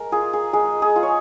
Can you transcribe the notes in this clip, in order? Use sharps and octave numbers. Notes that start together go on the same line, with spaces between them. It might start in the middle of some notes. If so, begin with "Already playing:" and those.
Already playing: G#3 A#4
F4 G#4
G#4
G#3 G#4
G#4
F4
C#5